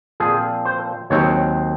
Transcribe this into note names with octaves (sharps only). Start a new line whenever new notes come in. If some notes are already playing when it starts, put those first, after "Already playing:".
A#2 F3 C4 G#4
C5
D#2 D#3 F#3 C4 C#5